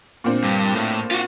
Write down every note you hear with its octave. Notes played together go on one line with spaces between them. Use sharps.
A#2 C4 D4
G2
A2
F4 F#4